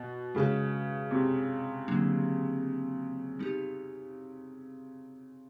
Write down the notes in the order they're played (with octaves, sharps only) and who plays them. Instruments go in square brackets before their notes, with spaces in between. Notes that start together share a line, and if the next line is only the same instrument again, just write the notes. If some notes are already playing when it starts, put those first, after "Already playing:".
Already playing: [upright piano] B2
[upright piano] C#3 [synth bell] G#3 C#4 F#4 B4
[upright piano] C3
[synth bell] D3 F#3 A#3 D4
G3 B3 D#4 G4